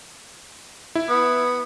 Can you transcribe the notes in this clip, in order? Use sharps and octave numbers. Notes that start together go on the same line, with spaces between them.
E4
B3